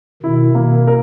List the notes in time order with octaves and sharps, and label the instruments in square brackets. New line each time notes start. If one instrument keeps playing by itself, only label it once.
[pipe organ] B2 D#3 [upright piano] E4
[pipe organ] B2 [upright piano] A#3
[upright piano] A#4